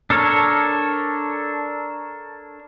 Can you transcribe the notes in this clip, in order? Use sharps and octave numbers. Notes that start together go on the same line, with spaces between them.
D4 A4 A#4 C#5